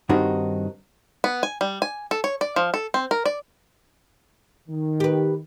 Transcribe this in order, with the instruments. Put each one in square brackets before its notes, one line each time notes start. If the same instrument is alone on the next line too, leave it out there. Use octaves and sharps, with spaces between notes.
[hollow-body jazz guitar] G2 D#3 C4 D#4 F#4
[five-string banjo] B3
G#5
G3
G#5
A4
C#5
D5
F3
A4
C4
A#4
D5
[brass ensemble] D#3
[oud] G4 B4